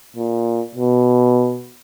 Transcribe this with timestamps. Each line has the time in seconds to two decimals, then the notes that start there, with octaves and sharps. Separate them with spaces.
0.16 A#2
0.75 B2